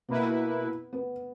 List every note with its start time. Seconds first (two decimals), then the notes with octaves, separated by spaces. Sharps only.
0.08 B2 A#3 B3 E4 B4
0.93 B3